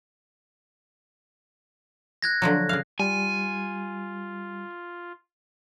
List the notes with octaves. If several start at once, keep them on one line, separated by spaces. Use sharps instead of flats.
F#6 G#6 A#6
D3 F3 F#3
C#3 F5
G3 F4 G#5